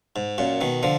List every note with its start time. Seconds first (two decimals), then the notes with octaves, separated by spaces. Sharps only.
0.16 G#2
0.38 F#2 A#2
0.61 B2 D#3
0.83 D3 F3